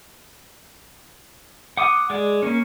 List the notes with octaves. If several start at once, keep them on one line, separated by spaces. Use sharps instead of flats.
F#5 D6 D#6
G#3 D5
A#3 C#4